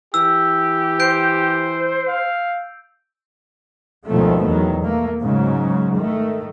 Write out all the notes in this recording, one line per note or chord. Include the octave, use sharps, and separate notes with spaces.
E3 G4 E6
C5 G6 D7
F5
G#1 D2 B2 D#3 F3 A3
E2 D#3 F#3
A3 A#3
G#2 C#3 F#3
D#3 A3